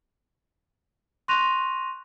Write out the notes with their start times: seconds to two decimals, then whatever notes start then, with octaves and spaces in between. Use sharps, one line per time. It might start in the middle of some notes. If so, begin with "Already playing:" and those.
1.28 C6 C#6 F#6 A#6 D#7 F7